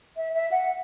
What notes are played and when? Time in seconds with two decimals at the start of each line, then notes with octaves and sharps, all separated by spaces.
0.17 E5
0.34 E5
0.51 F#5